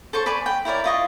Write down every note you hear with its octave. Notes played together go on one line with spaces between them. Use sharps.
A4 C5 A5 C#6
B4 D5 G#5 C#6
G5
E4 A#4 C#5 D5
E4 F4 D#5 C#6